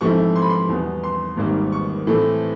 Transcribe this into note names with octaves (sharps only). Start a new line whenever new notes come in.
G#2 F3 A3 C4 E4 C#6
C6
B5
C6
E2 B2 G3 B3
C6
G#1 G#2 D#3 G3 A#3
C#6
A2 E3 A3 C4